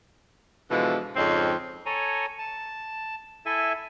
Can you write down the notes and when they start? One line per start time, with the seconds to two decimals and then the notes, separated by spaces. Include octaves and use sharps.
0.70 B2 D3 E3 F3 G#3
1.16 F2 G#2 C#3 C4 D#5
1.86 A4 C#5 G#5 A#5
2.39 A5
3.46 E4 A4 E5 G#5